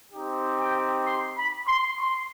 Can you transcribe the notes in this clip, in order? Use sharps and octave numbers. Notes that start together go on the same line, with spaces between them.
C4 D#4 G4
G5
C6
B5
C6
C6